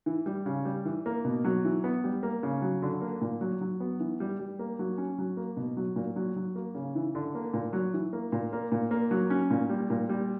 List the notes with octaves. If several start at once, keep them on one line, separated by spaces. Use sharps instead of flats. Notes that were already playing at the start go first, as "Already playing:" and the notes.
E3
G3
C#3
G3
E3
A#3
B2
F#3
E3
B3
G3
A#3
C#3
F#3
D3
A#3
A#2
F#3
F#3
B3
E3
G3
G3
A#3
F#3
C#4
F#3
A#3
B2
F#3
A#2
F#3
F#3
A#3
C#3
E3
D3
A#3
A#2
F#3
E3
A#3
A#2
A#3
A#2
A#3
F#3
C#4
A#2
G3
A#2
G3